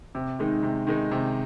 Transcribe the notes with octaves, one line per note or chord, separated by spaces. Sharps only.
C3
D#3 G#3 D#4
C3
D#3 G#3 D#4
C3